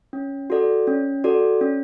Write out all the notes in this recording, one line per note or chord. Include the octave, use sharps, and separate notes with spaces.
C#4
F#4 A4 D5
C#4
F#4 A4 D5
C#4